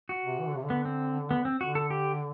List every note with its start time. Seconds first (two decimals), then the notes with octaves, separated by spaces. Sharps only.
0.09 F#4
0.25 C3
0.40 E3
0.48 D3
0.56 C3
0.64 D3
0.70 B3
0.85 C4
1.31 B3
1.45 C4
1.60 D3 F#4
1.75 A4
1.90 G4